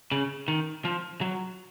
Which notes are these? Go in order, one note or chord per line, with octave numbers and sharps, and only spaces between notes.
C#3
D#3
F3
F#3